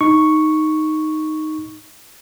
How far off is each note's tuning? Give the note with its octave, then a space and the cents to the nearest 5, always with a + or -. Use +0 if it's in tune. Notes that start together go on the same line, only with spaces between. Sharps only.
D#4 +0 C#6 +0